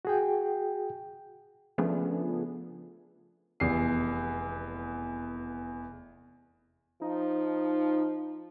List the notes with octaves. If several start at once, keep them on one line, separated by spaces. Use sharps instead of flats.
F#4 G#4 G5
C#3 F3 A3 B3 D4 G#4
F1 E2 C7
F3 D#4